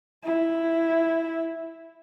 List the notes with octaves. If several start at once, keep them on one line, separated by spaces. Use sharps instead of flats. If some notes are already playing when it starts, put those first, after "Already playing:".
E4